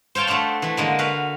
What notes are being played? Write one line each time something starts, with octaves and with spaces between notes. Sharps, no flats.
C5 C#5 F5 G5 A5
A3 D4 C5 D5 F#5
E3 A3
D3 G#3 A#3
F#4 B4 F5